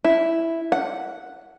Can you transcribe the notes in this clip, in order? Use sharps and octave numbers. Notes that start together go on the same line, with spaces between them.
E4
F#5